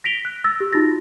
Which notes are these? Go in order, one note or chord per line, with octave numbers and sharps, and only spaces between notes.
A#6 B6 D7 F7 G7
F#6
E6 A6 A#6
G4
D#4 F4 F#4 A6 A#6